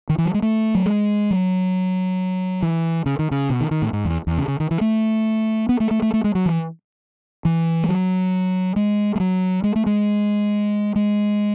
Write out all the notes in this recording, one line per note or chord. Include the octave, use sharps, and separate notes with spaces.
D#3
E3
F#3
G#3
A3
F#3
G#3
F#3
E3
C#3
D#3
C#3
B2
D#3
D#3
A2
G#2
E2
E2
C#3
C#3
D#3
E3
A3
B3
A3
A3
A3
A3
G#3
F#3
E3
E3
G#3
F#3
G#3
G#3
F#3
G#3
A3
G#3
G#3